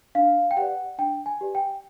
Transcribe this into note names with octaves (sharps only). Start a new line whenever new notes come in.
D4 F5
G5
G4 B4 D5 F#5
D4 G5
G#5
G4 B4 D5
G5